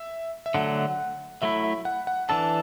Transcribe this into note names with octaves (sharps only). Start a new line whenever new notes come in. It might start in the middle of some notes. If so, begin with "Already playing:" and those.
Already playing: E5
E5
D3 F#3 A3 F#5
F#3 A3 E4 E5
E5
F#5
F#5
E3 D4 A4 A5